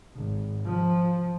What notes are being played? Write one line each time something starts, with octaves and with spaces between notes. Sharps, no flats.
G#1
F3